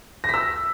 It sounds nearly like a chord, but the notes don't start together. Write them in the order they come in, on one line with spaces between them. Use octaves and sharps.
A#6 B6 E6